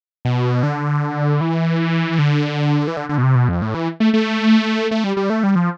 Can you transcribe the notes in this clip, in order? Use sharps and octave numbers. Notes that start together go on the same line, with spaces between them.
B2
D3
E3
D3
E3
D3
D3
B2
C3
B2
F2
A2
E3
A3
A3
A3
G3
G3
A3
G3
F3